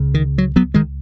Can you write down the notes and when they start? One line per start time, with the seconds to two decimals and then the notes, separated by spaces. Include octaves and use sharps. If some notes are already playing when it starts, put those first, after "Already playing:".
Already playing: C#2 C#3
0.14 D#3
0.38 F#3
0.56 F#3 B3
0.74 D#3 G#3